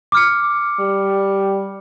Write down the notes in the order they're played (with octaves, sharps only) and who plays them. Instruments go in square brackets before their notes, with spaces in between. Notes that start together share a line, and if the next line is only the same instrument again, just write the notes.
[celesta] D6 F6 C#7
[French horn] G3